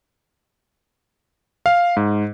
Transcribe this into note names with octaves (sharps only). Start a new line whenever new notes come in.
F5
G#2